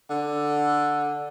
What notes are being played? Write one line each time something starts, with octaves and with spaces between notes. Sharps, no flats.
D3